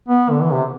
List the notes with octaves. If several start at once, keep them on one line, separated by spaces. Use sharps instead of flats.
B3
D3
E3
C3